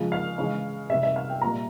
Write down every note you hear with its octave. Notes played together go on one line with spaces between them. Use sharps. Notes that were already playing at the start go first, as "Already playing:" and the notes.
Already playing: C#3 F3 G#3
F5
C#3 E3 G#3
C3 G3 E5
E5
F5
G5
A#2 G3 A#5